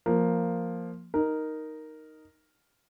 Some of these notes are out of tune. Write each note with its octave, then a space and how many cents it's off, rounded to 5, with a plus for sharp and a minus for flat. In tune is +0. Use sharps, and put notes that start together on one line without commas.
F3 +0 A#3 +0
D#4 +0 A#4 +0